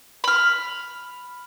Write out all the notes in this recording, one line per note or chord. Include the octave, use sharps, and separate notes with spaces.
B5 F6